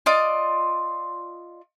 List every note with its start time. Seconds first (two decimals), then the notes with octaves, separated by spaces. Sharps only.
0.06 F4 D5 D#5